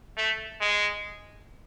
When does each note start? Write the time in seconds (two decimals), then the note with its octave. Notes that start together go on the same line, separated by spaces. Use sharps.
0.17 A3
0.61 G#3